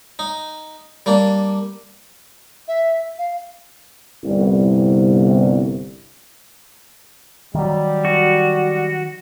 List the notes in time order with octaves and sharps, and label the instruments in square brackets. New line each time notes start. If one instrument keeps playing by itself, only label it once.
[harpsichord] D#4
G3 A#3 D4
[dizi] E5
F5
[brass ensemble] G1 C2
[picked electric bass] D#3 F#3 [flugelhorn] G3
[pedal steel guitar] F#4